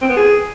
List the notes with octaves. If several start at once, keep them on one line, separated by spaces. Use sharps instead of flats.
C4
B3
G#4